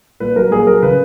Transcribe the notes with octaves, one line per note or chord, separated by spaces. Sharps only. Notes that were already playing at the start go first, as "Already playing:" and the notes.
A#2 B4
F#3 A#4
A#2 G#4
F#3 A#4
C#3 B4